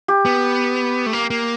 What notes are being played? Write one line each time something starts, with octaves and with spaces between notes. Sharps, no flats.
G4
B3
A3
A#3
A#3